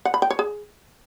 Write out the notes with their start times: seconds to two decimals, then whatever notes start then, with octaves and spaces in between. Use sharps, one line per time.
0.05 F#5
0.14 B5
0.22 G5
0.30 C#5
0.39 G#4